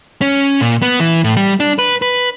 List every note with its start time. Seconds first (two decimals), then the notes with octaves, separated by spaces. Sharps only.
0.21 C#4
0.61 A#2
0.82 B3
1.00 E3
1.24 A2
1.37 G3
1.60 D4
1.79 B4
2.02 B4